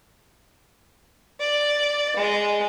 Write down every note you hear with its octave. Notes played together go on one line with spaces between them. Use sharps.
D5
G#3